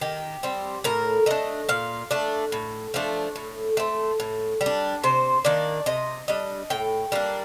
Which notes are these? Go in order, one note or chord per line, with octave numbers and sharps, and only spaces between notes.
D#3 G4
G3 C4
A2 A#4
A3 D4 D#5
A#2 F5
A3 D4
A2
F3 A3 D4
A2
A3 C4
A2
G3
D4
C3 C5
D#3 A#3 D4 D5
C3 D#5
G3 D4 D#5
A2 G5
G3 A#3 D4